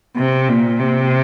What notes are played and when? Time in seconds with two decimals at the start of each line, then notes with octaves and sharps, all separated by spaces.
0.17 C3
0.48 A#2
0.79 C3